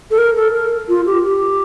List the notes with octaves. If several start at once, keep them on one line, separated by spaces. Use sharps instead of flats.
A4
A#4
A4
A#4
F4
G4
G4